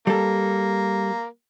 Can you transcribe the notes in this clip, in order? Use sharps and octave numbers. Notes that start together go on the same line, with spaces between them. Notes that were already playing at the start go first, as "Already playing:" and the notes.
G3 A#3 A4